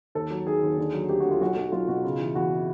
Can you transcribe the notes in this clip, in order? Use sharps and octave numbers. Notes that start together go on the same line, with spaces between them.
D#2 A4
F#3
D#3 G#4
D#2
D3
F#3
D2 G4
F#4
D2
F4
B1 F#4
B1
B1 F4
B2 F#4
C#3 F4
E3
E2 F#4